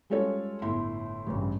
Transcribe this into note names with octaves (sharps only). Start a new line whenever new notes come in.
G3 G#3 C#4 F4 A4 C#5
G1 A2 E4 C6
A1 G2 C#3